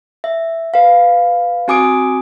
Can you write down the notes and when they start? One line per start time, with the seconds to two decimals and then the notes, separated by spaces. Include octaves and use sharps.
0.24 E5
0.74 B4 F5
1.68 C4 F#4 G#5 D6 D#6 D7